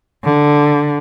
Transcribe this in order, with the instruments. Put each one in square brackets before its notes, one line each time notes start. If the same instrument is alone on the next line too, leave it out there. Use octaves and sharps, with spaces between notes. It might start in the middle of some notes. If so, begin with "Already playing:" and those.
[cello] D3